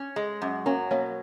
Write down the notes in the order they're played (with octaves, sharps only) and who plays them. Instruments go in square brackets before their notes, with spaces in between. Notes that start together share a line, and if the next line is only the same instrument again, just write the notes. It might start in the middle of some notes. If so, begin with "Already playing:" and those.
Already playing: [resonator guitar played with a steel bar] C#4
G#3
F#2
[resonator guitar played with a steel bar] F#3 [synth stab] A#3 C#4
[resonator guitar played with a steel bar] B2 [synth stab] A#3 C#4